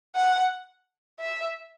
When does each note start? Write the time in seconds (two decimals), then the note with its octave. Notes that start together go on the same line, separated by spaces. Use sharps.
0.15 F#5
1.20 E5